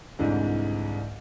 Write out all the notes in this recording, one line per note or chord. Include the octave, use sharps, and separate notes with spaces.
C2 G#2 D3 E3